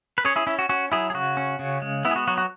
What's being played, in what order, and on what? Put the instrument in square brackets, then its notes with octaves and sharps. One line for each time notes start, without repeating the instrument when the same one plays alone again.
[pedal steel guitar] B4
C#4 G#4 C#5
E4 G#4
C#4 E4
F#4
C#4 F#4
F#3 E4 G#4
G#4
C#3 F#4
C#4
C#3
G#3
B3 E4
G#4
F#4
F#3 F#4
F#4